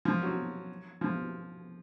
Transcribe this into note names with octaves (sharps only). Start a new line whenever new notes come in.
F3
F#3
F3